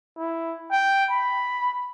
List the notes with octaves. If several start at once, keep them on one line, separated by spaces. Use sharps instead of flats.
E4
G5
B5